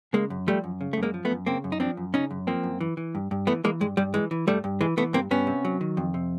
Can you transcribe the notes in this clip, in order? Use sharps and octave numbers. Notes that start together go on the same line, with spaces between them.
C#3 G#3 A#3
F#2
F3 G3 A3
F#2
C#3
F#2 A3
G#3 A#3
F3
A3 B3
F#2
C#3 A#3 C4
F#2
D#4
F3 C4 D4
F#2
C#3 C#4 D#4
F#2
F3 A#3 C4
F#2
E3
E3
G2
G2
E3 A3 B3
E3 G#3 A#3
G2 G#3
G2 G3
E3 G#3
E3
G2 G3 A3
G2
E3 G#3
E3 A3 B3
G2 A#3 C4
G2 B3 C#4
C3
F#3
D#3
F2
C3